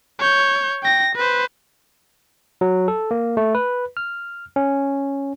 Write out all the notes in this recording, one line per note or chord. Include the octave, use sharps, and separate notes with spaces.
C#5 G6
G5 A#6
B4 C5
F#3
A4
A#3
A3
B4
F6
C#4